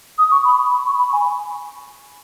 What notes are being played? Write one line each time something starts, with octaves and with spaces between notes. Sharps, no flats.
D#6
C#6
B5
B5
C#6
B5
G#5